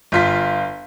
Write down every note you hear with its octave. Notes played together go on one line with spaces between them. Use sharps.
G1 F4 B6